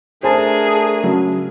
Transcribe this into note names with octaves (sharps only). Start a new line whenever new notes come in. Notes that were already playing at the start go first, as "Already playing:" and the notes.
A3 D4 G#4 A#4 C5 G#5 A5
C#3 F#3